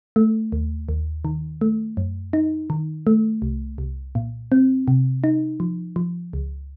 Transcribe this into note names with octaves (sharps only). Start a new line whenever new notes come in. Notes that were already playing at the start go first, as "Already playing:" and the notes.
A3
D#2
D#2
D#3
A3
F#2
D#4
D#3
A3
C2
C2
A#2
C4
C3
D#4
F3
F3
C#2